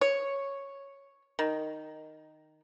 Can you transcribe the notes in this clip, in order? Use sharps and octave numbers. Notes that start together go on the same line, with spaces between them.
C#5
D#3